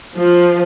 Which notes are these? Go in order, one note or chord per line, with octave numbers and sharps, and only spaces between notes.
F3